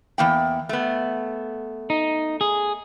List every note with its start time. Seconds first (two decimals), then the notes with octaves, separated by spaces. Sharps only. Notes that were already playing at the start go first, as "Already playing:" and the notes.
0.18 E2 A#3 G5
0.69 A3 B3
1.90 D#4
2.41 G#4